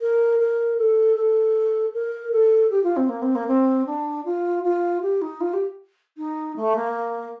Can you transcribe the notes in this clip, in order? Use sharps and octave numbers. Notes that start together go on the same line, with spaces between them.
A#4
A#4
A4
A4
A#4
A4
G4
F4
C4
A#3
C4
A#3
C4
D4
F4
F4
G4
D#4
F4
G4
D#4
A3
A#3